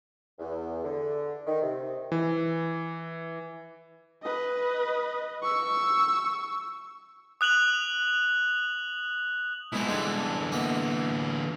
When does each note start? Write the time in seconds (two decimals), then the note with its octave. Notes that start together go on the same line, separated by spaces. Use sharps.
0.39 E2
0.83 D3
1.47 D#3
1.61 C3
2.12 E3
4.23 B4 D#5
5.42 C#6 E6
7.41 D#6 F#6 F7 F#7
9.72 B2 F#3 G#3 C4 E4
9.88 D3 E3 G3 G#3 B3
10.52 A#3 B3 D#5